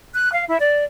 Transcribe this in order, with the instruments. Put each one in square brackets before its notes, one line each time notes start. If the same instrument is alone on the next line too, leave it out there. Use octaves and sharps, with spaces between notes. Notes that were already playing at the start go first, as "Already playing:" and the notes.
[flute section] F#6
F5
E4
D5